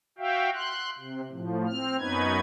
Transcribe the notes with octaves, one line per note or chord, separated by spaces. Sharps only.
F#4 E5 F5 G5
C6 F#6
C3
A2 F3
C4 F6
F#2 B3 C#4 D#4 B4 G#6